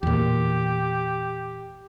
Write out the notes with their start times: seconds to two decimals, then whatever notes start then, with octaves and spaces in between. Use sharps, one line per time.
0.03 E2 A#2 G4